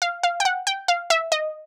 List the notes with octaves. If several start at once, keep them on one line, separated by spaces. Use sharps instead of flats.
F5
F5
G5
F#5
G5
F5
E5
D#5